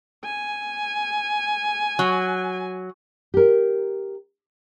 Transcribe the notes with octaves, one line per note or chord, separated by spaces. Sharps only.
G#5
F#3
G4 A#4